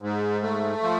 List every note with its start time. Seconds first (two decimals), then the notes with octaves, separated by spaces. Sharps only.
0.02 G#2
0.43 A3
0.83 F3